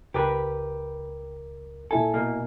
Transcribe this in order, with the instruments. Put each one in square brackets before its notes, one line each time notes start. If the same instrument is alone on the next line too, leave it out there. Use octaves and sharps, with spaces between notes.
[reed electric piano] C#2 A#4 D6 [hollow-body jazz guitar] G4 B4
[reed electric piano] A#2 E4 G#5 [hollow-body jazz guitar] A4
[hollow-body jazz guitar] B2 A#3